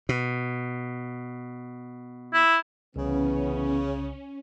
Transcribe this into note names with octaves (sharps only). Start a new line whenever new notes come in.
B2
E4
C2 C#3 E3 B3 C#4